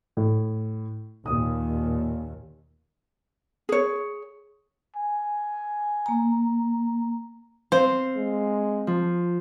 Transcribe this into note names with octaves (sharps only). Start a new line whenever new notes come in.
A2
D#2 A#2 D#6
G#4 C#5
G#5
A#3 A#5
C4 C5 F5
G#3
F3